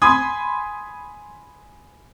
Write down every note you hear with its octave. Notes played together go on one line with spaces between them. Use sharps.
G#5 B5 C6 D#6 G#6